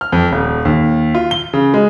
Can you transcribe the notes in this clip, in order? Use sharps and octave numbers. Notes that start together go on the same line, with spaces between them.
F6
F2
D#1
D#2
F4
G7
C#3
G#3